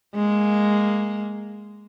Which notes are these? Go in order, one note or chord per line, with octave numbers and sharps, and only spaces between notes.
G#3 A#3